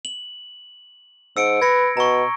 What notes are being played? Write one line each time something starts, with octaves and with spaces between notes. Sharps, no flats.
F#7
G#2 E6 C#7 D7
B4 G#6 A#6 C#7
B2 A#5 C#6